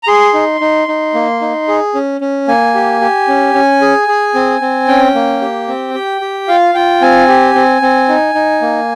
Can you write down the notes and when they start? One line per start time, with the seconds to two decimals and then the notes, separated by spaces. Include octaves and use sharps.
0.03 A#5
0.08 G#4 C6
0.34 D#4
0.61 D#4
0.88 D#4
1.14 A#3
1.41 D#4
1.68 G#4
1.95 C#4
2.21 C#4
2.48 A#3 G#5
2.75 G4
3.01 G4
3.28 C#4
3.54 C#4
3.81 G#4
4.08 G#4
4.35 C4
4.61 C4
4.88 C#4 G5
5.15 A#3
5.41 G4
5.68 C4
5.94 G4
6.21 G4
6.48 F4 F5
6.75 F4 G5
7.01 C4 G#5
7.28 G4
7.55 C4
7.82 C4
8.08 D#4
8.35 D#4
8.62 A#3